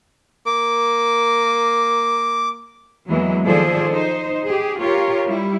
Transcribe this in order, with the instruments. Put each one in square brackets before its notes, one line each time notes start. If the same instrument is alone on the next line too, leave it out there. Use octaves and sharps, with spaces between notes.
[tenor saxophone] A#3 [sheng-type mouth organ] D6
[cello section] E2 E3 F#3 G#3 A#3
D#3 F3 G#4 A4 C5 D5
D#4 C5
G4 G#4
F4 G4 A#4 C#5
G3 E4